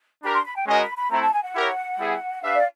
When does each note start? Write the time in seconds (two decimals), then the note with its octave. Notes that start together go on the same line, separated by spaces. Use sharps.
0.23 D4 G4 A#4 B5
0.33 C6
0.45 B5
0.56 G5
0.67 G#3 C#4 F#4 A#4 D#5 G#5
0.81 B5
0.96 B5
1.10 A3 C4 E4 A#5
1.22 A5
1.33 G#5
1.44 F#5
1.55 E4 G4 A#4 C#5
1.99 G3 B3 E4 G#4
2.43 D4 G4 B4 E5 F5
2.55 D5